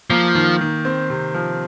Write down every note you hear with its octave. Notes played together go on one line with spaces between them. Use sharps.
F3 A#3
D#3
D#3
C4
C3
F3